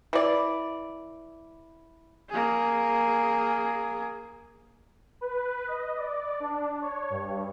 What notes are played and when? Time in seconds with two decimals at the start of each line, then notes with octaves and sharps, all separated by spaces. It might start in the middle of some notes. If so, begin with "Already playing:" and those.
0.13 E3 D5
2.29 A#3 G#4
5.21 B4
5.67 D#5
5.97 D5
6.40 D4
6.81 C#5
7.10 G2